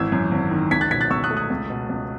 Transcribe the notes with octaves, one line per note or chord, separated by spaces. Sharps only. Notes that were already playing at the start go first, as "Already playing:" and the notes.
Already playing: G#1 E3 E6 G#6
F#2
G#1
D#3
C#2 G#6 B6
F#6 A6
B2 G#6 B6
F#6 A6
C#2 C#6 E6
D#6 F#6
A3
D#6 F#6
C#2
B2
C#2